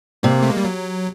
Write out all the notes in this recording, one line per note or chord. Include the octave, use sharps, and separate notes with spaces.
C3 A#3
A3
G#3
G3
F#3